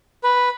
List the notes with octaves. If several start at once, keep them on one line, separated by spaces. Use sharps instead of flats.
B4